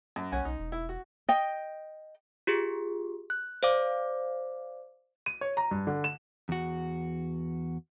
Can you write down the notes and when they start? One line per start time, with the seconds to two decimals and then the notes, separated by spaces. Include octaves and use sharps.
0.16 F#2
0.32 B1 C#4 F#5 G#5
0.45 B1 D#4
0.59 E1
0.72 E4
0.89 F#4
1.29 D#5 G5
2.47 F4 G4 G#4
3.30 F#6
3.63 C5 D5 F5 D6
5.26 D#7
5.41 C#5
5.57 A#5
5.71 G2
5.87 D3
6.04 E7
6.49 E2 F#4